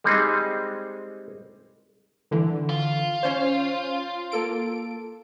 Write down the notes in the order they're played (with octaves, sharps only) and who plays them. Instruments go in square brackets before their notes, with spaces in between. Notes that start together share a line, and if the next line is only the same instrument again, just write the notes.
[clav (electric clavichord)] G3 G#3 C4 D#4 G#4
[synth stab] D3 E3
[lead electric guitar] F4
[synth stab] C#4 C5
A#3 A4 D7